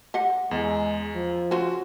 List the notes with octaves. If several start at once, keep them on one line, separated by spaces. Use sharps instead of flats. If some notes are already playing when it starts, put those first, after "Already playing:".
G4 D#5 F#5
E2 G#3
F3
C#3 C#4 F#4 C5